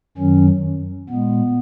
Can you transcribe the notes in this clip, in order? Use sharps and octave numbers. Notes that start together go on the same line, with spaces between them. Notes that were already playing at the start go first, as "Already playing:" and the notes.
F#2 D#3 F#3 C#4
A#2 G#3 B3